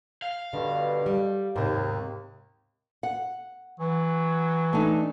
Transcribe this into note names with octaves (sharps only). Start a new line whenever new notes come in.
F5
G2 B2 D3
G3
D#2 G#2 C3
F#5
E3 F#3
A3 D4 D#4